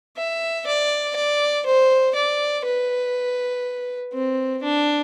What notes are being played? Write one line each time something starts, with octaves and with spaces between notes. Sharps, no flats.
E5
D5
D5
C5
D5
B4
C4
D4